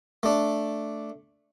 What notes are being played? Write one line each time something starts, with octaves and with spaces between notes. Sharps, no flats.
A3 D4